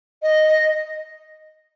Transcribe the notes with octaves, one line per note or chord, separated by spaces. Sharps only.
D#5